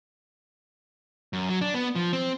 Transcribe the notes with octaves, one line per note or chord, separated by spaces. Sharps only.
F#2
F#3
D4
B3
F3
C4